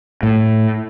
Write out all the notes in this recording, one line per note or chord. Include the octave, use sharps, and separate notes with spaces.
A2